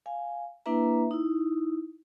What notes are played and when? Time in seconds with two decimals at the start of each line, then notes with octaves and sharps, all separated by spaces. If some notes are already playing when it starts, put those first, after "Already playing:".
0.06 F5 G#5
0.66 A#3 D4 E4 B4 E5 A#5
1.11 D#4 E4